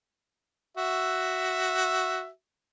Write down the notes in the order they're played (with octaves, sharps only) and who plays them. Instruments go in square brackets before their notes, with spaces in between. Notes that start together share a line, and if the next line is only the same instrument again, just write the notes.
[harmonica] F#4 E5